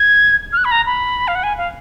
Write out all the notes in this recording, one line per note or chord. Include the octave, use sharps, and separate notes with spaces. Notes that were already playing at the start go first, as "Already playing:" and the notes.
Already playing: G#6
F6
F#6
B5
A#5
B5
F5
F#5
G#5
F5